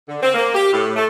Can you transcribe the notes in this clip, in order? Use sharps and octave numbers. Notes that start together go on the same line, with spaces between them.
D3
C4
A#3
G4
A2
A3